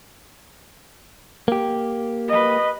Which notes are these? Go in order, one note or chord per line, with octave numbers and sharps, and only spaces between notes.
A#3 G4
B4 D#5